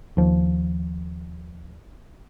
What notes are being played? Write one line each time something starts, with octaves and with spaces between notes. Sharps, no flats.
D#2 F3